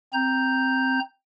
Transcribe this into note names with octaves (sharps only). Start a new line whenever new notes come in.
C4 A#5 G6